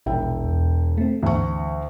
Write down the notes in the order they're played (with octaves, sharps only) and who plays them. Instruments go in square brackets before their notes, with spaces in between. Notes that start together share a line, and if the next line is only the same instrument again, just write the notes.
[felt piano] E1 E4 G5 [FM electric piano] A#1
[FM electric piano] E2
A3 C4
[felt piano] D2 C#6 [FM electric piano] E3